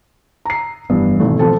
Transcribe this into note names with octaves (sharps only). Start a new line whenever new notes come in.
A#5 C7
F1 G2 E3 B3
G#1 B2 E3 A3
F3 C4 A4